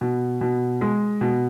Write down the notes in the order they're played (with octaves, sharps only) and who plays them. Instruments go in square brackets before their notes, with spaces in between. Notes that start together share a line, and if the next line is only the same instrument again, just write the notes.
[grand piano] B2
B2
G#3
B2